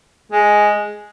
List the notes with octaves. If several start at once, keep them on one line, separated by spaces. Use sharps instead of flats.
G#3